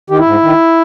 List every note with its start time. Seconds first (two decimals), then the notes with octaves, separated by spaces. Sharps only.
0.10 D#3 G4
0.19 E4
0.26 G#2
0.42 D#3